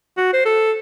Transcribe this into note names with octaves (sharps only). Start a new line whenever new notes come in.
F#4
C5
A4